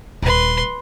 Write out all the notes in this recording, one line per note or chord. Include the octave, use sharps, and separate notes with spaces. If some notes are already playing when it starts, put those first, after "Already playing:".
D#1 B4 C6